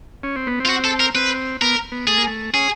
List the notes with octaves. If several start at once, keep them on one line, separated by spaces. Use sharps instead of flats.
C#4
C4
B3
C4
F4
F#4
A4
A#4
C4 B4
B3 A#4
B3
A3 G#4
A#3
A3
C#4 G#4